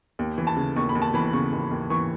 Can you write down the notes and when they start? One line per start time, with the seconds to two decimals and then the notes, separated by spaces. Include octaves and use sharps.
0.19 D#2
0.38 E3
0.47 A5
0.57 C#3
0.76 D#2 C#6
0.89 B5
0.95 D#2
1.02 A5
1.14 E3 B5
1.33 C#3 C#6
1.53 D#2
1.71 D#2
1.90 E3 C#6